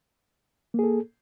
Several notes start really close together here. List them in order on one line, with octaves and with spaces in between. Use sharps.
A#3 G#4 A4